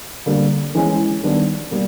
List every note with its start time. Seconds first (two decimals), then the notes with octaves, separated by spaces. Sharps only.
0.26 D3 G3 A#3
0.75 E3 G#3 C#4
1.23 D#3 G3 B3 D4
1.71 G3 A#3